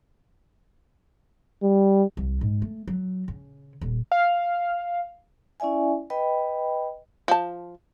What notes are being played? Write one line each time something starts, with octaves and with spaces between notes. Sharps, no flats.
G3
C2
G#2
A3
F#3
C#3
D#1
F5
C#4 E4 D5 E5 G#5
B4 D#5 G5 B5
F3 A5